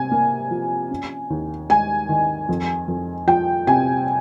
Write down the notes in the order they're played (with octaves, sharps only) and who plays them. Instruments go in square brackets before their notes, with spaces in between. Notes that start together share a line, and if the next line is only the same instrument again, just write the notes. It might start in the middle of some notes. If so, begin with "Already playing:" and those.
Already playing: [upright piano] C3 [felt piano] G#5
[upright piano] A#3
F3
C#4
D#2
[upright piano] G#3 [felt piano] G#5
[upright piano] D#3
F2
F2
[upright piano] F3 [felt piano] G5
[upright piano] C3 [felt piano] G#5